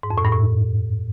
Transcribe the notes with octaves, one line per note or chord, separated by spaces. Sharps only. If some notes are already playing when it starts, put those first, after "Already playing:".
G#2
F2
A2
G2
A2